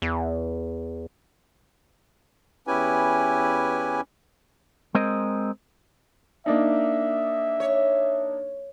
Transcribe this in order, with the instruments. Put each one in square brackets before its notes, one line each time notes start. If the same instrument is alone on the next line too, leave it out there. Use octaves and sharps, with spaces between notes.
[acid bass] E2
[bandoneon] E2 C#4 E4 G4 B4 G#5
[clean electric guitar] G#3 C4 A#4 D#5
[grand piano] A#3 D4 D#4 [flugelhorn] E5
[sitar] C#5